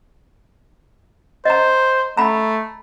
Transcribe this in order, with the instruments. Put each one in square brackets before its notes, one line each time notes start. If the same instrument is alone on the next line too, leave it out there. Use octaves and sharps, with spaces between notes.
[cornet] C5 [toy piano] D#5 A#5
[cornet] A3 [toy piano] A#5 B5